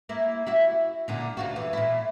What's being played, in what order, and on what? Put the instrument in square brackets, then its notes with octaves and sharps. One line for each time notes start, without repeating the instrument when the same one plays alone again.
[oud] A#3 E4
E4 F#4 E5
A#2 D3 D4
D2 F4 F#4
E3
A#2 E4